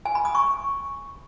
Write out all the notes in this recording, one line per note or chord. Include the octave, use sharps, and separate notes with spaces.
G#5
B5
D#6
C#6